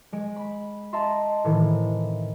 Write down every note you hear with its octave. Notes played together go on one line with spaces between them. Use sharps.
G#3 D7
B5
D#5 E5 A5 A#5 C6
A2 C3 D#3 E3